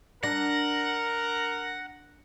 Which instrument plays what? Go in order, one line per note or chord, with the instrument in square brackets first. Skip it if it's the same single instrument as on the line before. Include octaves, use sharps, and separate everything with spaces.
[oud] D4 [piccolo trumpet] A#4 [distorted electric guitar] F#5 [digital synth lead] A#6